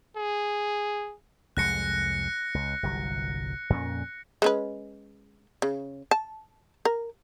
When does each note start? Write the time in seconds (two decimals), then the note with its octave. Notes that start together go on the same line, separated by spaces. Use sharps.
0.17 G#4
1.57 C2 F2 G#3 F#6 A#6 C#7
2.54 C#2
2.83 G1 C2 F#3
3.70 F2 A#2 C#4
4.42 G#3 C#4 B4
5.62 C#3
6.11 A5
6.85 A#4